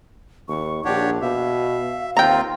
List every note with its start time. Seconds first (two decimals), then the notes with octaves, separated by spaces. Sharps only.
0.48 D#2 C#6
0.85 A#1 D4 G4 C#5 F#5
1.21 B2 E5 F5
2.17 D#2 C4 F4 G5 A#5